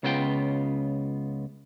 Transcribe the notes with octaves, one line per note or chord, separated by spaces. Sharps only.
C#2 C#3 B3 E4 F4 G5